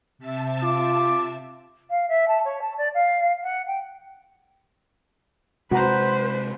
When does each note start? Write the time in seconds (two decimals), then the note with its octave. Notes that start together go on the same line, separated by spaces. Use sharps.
0.18 C3 E5 A5
0.63 F4 D6
1.90 F5
2.09 E5
2.28 A5
2.45 C#5
2.62 A5
2.78 D5
2.94 F5
3.43 F#5
3.67 G5
5.71 C3 G#3 F#4 B4 C5 A#5